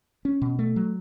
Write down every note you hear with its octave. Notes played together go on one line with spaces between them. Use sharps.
C#4
B2
A3
F#3